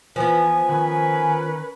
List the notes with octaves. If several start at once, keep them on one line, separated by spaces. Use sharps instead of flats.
E3 F3 B3 B4 G#5
D#3 C#4 A#4 B4